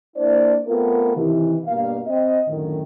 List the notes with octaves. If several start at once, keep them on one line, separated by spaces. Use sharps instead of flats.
A#3 D4 E4 C5 D5
A3 B3 C4 F4 A4 A#4
C3 D#3 E3
G2 B2 A#3 F5
C4 D#5
F#2 A2 D3 D#3